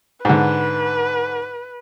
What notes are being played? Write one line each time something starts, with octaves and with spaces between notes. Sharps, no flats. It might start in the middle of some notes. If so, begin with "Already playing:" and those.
G#2 D3 B4